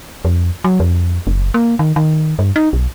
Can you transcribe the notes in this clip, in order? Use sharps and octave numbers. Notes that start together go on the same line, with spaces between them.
F2
F#3
F2
F#1
A#3
D#3
D#3
G2
D#4
B1